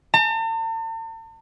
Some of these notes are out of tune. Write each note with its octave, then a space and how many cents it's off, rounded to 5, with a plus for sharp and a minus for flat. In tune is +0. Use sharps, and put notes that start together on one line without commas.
A5 +45